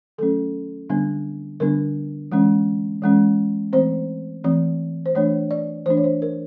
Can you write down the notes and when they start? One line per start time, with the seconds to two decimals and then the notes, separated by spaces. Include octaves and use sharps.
0.18 D#3 F#3 A3 C#4 A4
0.89 D3 G3 B3 D4
1.60 D3 G3 B3 D4 A#4
2.32 E3 G#3 C#4
3.02 E3 G#3 C#4
3.73 E3 A3 C4 C5
4.44 E3 A3 C4
5.06 C5
5.15 E3 A3 D4 C#5
5.51 D5
5.86 E3 A3 D4 C5
5.97 C#5
6.04 C5
6.22 A#4